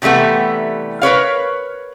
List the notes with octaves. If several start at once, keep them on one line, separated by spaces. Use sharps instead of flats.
C3 E3 G3 A3 B3
A#4 B4 C#5 F5